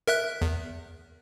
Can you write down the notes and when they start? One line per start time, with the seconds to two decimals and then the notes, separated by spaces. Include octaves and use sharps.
0.08 A#4 E5 F#6
0.42 E2